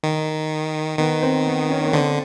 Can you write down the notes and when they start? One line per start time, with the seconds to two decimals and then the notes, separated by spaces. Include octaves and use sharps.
0.03 D#3
0.99 D#3 B3
1.22 C4
1.47 B3
1.70 C#4
1.79 A#3
1.87 B3
1.93 D3 C4